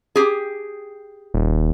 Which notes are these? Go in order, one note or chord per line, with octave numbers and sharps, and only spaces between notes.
G4 G#4
D#1